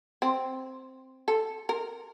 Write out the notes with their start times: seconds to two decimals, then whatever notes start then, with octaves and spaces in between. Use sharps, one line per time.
0.22 C4
1.28 A4
1.69 A#4